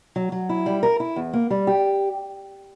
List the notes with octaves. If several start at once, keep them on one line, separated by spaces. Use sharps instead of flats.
F#3
F#3
E4
G3
A#4
E4
E2
A#3
G3
G4